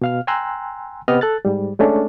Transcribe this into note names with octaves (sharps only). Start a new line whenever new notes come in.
B2 F5 F6
G5 G#5 A#5 C6 E6 F#6
C3 B3 G4 D#5 F6
A4 F#6 A6
G#2 G3
G#3 A3 C#4 D4 A4